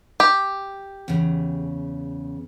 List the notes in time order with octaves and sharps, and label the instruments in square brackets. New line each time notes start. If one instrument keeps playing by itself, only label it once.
[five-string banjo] G4
[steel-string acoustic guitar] E2 C#3